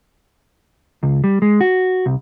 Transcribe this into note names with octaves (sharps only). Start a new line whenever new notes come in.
C#2
G3
G#3
F#4
C2